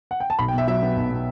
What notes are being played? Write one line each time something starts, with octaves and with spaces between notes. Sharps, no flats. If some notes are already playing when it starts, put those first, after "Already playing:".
F#5
G5
A5
B1 B5
G5
B2 E5
F#3 E5
B3
B1
B2